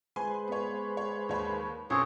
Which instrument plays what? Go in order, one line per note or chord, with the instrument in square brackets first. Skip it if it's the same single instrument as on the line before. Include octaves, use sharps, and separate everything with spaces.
[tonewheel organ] G#3 B4 C5 [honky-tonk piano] G#5 C6
[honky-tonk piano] B3 C#5
C#5
D#2 C#5 B5
[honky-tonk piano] B1 F#2 [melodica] C4 G#4 C#5